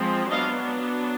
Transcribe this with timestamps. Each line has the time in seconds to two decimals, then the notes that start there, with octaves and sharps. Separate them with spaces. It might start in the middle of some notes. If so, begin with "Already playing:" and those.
Already playing: F3 G#3 C4
0.30 F#3 B3 D4 D#5 F5